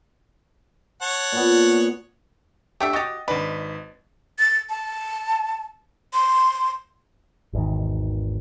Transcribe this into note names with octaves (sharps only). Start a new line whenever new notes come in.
C#5 F#5 A5
A#2 B3
A3 D4 G4 E5
F#4 G4 D#5 A6
G#1 D4 D#4 B4
A6
A5
C6
G#1 E2 D#3